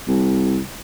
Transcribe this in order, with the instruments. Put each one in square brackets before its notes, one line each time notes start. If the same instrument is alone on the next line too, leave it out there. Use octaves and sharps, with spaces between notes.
[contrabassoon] C2